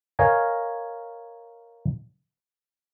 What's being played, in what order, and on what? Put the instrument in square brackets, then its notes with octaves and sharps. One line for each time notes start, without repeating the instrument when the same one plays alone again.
[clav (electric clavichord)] A#4 C#5 D#5 F5 G#5